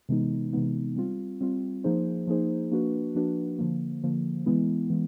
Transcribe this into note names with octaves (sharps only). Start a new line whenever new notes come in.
C3 E3 G#3 B3 D#4
C3 E3 G#3 B3 D#4
G3 C4 F4
G3 C4 F4
F3 A#3 D#4 G#4 C5
F3 A#3 D#4 G#4 C5
F3 A#3 D4 F#4 B4
F3 A#3 D4 F#4 B4
D3 F3 A#3
D3 F3 A#3
E3 G#3 B3 E4
E3 G#3